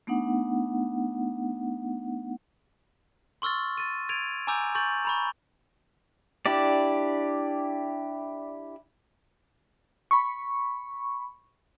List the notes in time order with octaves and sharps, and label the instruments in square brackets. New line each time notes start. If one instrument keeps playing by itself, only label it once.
[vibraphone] A3 B3 D4 D#4 F#5
[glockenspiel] C6 C#6 E6 F6 A6
A6 D#7
G#6 A6 D7 D#7 F7
G#5 A#5 D6 E6 G6 F7
C#6 G6 A6 F#7
A#5 B5 C#6
[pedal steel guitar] D4 E4 G4 D5
[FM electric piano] B5 C#6